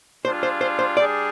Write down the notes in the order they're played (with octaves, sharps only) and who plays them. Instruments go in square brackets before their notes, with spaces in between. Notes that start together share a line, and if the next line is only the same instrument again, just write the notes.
[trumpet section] G3 D4 F4 G#4 [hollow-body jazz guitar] C5
[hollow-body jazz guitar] C5
C5
C5
[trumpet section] G3 D4 G#4 [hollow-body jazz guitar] D5